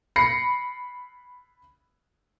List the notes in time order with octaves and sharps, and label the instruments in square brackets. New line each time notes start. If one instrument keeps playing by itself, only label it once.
[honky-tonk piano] B5 A#6 C7 C#7